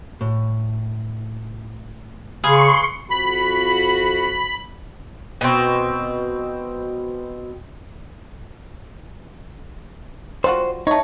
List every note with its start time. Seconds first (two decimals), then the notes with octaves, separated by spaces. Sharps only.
0.21 A2
2.44 C#3 G#4 B4 F5 C6 C#6
3.11 F2 F#4 B5
5.41 B2 C4
10.44 G3 F4 F#4 C5
10.87 A3 D#4 C#5